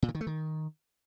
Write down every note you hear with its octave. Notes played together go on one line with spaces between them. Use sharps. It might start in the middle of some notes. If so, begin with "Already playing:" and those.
A#2
D3
D#3
A3
D#3